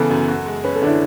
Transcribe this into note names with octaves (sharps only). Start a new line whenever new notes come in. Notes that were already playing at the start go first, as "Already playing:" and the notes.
Already playing: C#3 E3 B3 A4
F#2
F#4
G#3
C#4 B4
A4
D3 D4
E4